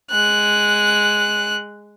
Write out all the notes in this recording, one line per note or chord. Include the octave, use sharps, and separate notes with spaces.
G#3 F#6